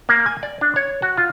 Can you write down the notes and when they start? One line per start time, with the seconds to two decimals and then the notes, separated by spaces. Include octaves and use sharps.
0.09 A#3
0.26 G#5
0.43 D5
0.61 D4
0.76 C#5
1.02 F#4
1.17 F4